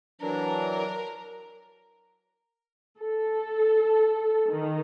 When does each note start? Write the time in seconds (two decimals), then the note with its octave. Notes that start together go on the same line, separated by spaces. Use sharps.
0.21 E3 F#3 D4 A#4
3.00 A4
4.51 D#3